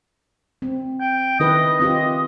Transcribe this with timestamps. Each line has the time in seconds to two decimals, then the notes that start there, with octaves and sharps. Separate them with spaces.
0.62 C4
1.00 G5
1.40 D#3 E4 B4 D#5
1.80 C4 F4 G4 D#5